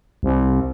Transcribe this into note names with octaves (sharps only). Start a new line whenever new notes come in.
C2